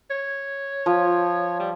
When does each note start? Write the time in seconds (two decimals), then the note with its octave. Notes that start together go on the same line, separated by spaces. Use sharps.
0.10 C#5
0.86 F3
1.60 G3